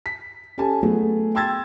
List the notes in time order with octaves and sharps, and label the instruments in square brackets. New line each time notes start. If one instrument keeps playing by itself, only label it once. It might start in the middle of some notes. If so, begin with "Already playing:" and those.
[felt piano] B6
C#4 G4 A4 G#5 A5
F#3 A3 B3 G#4 A4
G5 C6 E6 G#6 A6